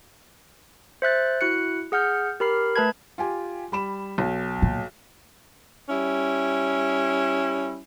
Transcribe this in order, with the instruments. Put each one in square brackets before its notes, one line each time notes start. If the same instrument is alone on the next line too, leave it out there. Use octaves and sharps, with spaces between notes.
[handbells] C5 E5 F#6 A6
E4 F#4 F#6 C#7
G#4 F#5 F6 G6
G4 A#4 B5 F6 C7
A3 B4 A5 B5 G#6
[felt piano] F4 G4 G#5
G3 B5 E7
B1
[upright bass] A#2
[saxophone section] G3 C#4 E4